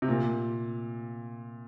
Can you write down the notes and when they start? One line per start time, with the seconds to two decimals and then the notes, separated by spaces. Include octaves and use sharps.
0.02 C3
0.08 A#2